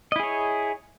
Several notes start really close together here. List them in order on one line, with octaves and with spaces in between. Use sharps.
D#5 E4 G#4 C#5